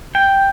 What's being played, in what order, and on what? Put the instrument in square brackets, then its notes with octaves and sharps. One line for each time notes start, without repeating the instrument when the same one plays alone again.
[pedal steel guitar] G5